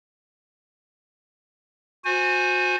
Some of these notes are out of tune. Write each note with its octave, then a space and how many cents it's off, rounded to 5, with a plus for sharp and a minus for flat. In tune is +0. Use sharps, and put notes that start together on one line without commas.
F#4 -30 C5 +0 G#5 +0